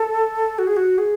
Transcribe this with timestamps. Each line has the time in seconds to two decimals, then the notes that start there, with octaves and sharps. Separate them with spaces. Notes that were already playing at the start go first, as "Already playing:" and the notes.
Already playing: A4
0.59 F#4
0.67 G#4
0.77 F#4
0.98 G#4